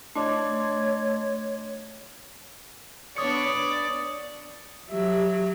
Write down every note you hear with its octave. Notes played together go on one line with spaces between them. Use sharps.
A3 D4 C#5 D#5 C6 D6
B3 D4 C#5 D5 D#6 C#7
F#3 G4 E5